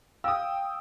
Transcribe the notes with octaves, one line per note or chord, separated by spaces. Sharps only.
F5 G5 D#6 E6